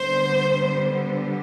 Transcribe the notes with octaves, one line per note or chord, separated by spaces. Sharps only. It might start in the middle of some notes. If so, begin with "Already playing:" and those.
Already playing: D3 G3 B3 C5